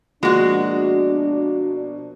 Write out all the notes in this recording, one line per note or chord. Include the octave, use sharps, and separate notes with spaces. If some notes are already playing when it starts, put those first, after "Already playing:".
B2 F3 G#3 A#3 D4 F#4